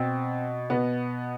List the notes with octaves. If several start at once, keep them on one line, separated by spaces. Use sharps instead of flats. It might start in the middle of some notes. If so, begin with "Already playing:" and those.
Already playing: B2 C4
B2 B3